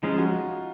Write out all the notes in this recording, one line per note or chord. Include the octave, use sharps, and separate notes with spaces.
F3 G#3 C#4 D#4
F#4
F4
F4